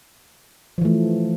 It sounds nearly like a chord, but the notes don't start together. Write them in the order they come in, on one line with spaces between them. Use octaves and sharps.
F3 E3 A3